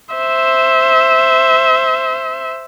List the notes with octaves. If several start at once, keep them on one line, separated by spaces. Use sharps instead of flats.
C5 E5